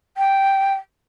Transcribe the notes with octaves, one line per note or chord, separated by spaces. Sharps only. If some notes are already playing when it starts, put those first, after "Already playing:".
G5